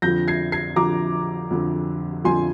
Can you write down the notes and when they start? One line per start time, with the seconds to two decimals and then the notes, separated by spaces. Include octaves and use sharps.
0.02 F2 D3 F3 G6 A#6
0.28 G#6 C7
0.52 G#6 C7
0.76 F2 D3 F3 A#5 D6
1.51 F2 D3 F3
2.24 F2 D3 F3 G#5 C6